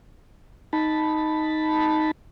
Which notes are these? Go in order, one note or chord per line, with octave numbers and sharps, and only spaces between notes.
D#4 A5 B5